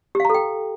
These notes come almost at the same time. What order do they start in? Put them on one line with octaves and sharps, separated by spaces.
G4 F5 A#5 A4 G5